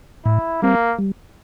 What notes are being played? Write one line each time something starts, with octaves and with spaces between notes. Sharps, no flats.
A2 E4
G3 A#3 C4
G3